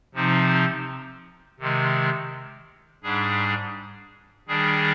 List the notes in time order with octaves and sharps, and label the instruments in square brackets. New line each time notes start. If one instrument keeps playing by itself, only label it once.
[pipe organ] C3 F3 C4 D#4
C3 D#3 G#3
G#2 G3 D4 G#4
D#3 G3 D4 G#4